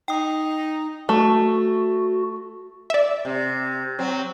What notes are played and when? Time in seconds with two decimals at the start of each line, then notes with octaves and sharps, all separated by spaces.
0.08 D#4 G5 D#6
1.09 A3 F#4
2.90 D5 E5
3.25 C3
3.99 F#3 C4